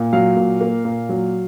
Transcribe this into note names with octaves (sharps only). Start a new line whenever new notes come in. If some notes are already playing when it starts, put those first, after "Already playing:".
Already playing: A#2
F#3 F5
A#2
A#3
A#2
F#3